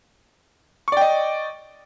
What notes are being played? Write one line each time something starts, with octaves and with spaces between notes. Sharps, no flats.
D5 D#5 G5 C#6